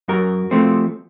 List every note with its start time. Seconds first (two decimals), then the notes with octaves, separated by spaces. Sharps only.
0.08 F#2 F#4 A#4
0.51 F3 A3 C4